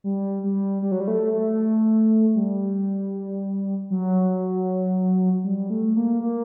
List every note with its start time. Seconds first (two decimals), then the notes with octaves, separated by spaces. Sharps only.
0.04 G3
0.44 G3
0.82 G3
0.92 F#3
1.00 G3
1.08 A3
1.33 A3
2.36 G3
3.90 F#3
5.44 G3
5.70 A3
5.96 A#3
6.22 A#3